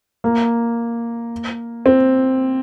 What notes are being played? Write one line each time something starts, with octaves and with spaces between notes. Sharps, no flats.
A#3
C4